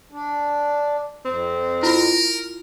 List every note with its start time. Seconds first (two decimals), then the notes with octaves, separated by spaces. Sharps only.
0.12 D4
1.25 F2 C4
1.83 E4 F4 A#4